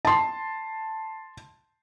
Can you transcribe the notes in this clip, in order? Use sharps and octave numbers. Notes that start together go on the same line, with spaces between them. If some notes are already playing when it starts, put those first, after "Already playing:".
A5 C6